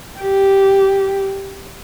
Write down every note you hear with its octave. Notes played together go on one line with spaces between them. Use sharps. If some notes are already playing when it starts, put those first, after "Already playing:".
G4